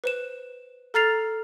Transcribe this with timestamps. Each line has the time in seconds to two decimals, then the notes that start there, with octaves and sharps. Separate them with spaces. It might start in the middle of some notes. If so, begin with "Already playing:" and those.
0.04 B4 C5 E7
0.94 A4 A#5 F6 A6 C7 F7